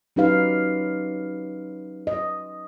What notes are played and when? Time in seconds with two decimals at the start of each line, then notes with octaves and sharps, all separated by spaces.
0.16 F#3 C#4 D#4 G4 B4 F5
2.07 D#5